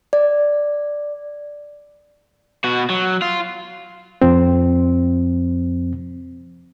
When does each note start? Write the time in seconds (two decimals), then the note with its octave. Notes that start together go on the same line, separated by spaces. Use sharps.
0.13 D5
2.64 B2 F#4
2.90 F#3
3.22 F4
4.22 F2 F3 C4